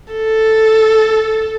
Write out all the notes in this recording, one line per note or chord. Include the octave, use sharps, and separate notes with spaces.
A4